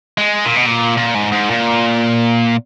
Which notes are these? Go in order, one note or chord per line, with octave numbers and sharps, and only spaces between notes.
G#3
A#2
B2
A#2
A#2
G#2
G#2
A#2